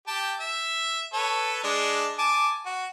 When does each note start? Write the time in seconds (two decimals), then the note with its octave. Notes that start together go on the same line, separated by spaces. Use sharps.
0.07 G4 G5 A5
0.40 E5
1.13 A4 B4 C#5
1.64 G#3 D4
2.19 G#5 A5 D6
2.66 F#4